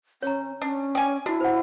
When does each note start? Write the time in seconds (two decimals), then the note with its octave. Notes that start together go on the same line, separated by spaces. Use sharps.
0.23 C#4 C#5 A#5
0.61 C#4 D4
0.95 D5 G5 G#5
1.26 D4 E4 F#4
1.41 C5 F#5